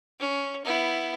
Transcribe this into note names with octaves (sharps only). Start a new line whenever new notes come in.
C#4
B3 E4